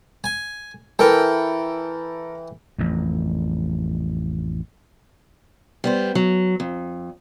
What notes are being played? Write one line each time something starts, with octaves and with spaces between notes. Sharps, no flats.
G#5
E3 A4 A#4 G5
A1 F2
G3 B3 C5
F#3
F2